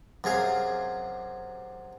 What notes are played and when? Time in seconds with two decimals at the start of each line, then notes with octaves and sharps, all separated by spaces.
0.24 F#2 C3 G#4 F5